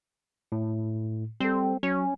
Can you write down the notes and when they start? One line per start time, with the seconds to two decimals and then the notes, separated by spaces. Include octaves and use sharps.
0.52 A2
1.40 G3 C4 A4
1.83 F#3 C#4